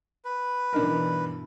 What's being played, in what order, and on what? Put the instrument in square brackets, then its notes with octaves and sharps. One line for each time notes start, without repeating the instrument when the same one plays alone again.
[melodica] B4
[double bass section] G2 B2 E3 [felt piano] D4 D#4 A#4